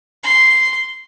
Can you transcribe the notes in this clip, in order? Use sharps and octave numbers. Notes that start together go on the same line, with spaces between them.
C6